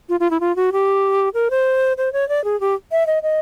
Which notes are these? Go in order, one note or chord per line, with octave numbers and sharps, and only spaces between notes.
F4
F4
E4
F4
F#4
G4
A#4
C5
C5
C#5
D5
G#4
G4
E5
D#5
D#5